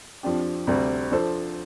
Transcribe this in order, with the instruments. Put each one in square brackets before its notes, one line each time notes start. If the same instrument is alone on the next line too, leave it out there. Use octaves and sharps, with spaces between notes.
[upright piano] F2 F3 D4 G4
D2 C3 G3 D4
F3 D4 A4 C5